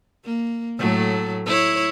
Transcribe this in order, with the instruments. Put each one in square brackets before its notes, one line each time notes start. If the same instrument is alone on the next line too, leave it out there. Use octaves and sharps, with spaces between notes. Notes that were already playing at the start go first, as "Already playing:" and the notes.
[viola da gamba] A#3
A2 F#3 A3
E4 C#5